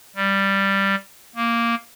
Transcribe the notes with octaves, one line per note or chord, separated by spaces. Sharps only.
G3
A#3